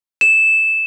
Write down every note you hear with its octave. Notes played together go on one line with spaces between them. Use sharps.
E7